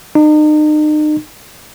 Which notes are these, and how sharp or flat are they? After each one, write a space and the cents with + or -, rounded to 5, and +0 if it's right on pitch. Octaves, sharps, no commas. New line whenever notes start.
D#4 -40